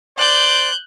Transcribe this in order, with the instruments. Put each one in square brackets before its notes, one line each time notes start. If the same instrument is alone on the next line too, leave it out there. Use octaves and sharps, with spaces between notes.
[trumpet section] C5 D5 [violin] F#6 G6